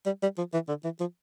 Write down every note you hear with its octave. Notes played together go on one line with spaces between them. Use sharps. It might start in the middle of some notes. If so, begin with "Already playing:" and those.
G3
G3
F3
E3
D3
E3
F3